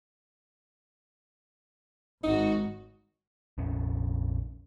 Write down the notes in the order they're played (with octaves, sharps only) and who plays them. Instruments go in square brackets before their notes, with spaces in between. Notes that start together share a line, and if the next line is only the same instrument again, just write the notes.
[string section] G#1 F#4 [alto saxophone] D#4
[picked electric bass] A#1 F2 C#4